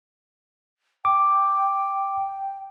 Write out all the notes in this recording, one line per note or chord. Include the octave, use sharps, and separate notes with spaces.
G5 D6